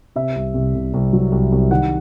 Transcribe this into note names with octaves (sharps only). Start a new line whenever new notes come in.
C3 E5
C2
C2
C2
C2
F#3
C2
C2
D#3 F#5